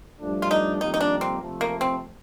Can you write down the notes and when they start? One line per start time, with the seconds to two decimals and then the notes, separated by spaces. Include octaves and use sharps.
0.20 G2 F3 A3 D4
0.42 F4
0.51 D#4
0.81 F2 D#3 G3 A#3 D#4
0.94 D#4
1.01 D4
1.21 C4
1.41 C3 F3 A3
1.61 A#3
1.81 C4